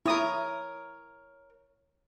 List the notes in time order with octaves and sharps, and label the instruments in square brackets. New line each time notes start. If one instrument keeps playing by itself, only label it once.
[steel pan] E4 D#6 [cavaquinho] A#4 C#5